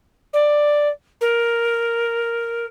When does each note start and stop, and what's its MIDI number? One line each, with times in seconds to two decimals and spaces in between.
0.33 0.89 74
1.21 2.66 70